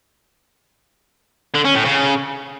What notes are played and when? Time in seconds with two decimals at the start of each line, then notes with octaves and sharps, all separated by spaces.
1.55 D3
1.65 C#4
1.75 A2
1.85 C#3